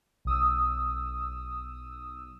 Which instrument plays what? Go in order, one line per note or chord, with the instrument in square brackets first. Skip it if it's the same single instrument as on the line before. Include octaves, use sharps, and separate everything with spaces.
[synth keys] B1 D#6 E6